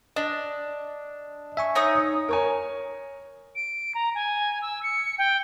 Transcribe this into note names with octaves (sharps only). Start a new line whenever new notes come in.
D4 D#5
E5 G#5 C#6
D#4 C#5 D#6
A#4 C#5 G#5
D7
A#5
G#5
E6
C#7
G5